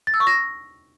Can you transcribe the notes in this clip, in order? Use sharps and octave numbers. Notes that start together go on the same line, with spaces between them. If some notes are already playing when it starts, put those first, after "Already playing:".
A6
E6
C#6
A#6